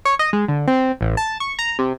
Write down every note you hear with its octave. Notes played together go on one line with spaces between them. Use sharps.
C#5
D#5
G#3
D3
C4
A1
A5
C#6
A#5
C3